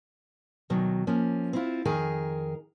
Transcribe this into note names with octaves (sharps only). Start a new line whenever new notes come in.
D2 B2 D#3 F#3
F3 A#3 C#4
C4 E4 F4
F2 D#3 G#4 A#4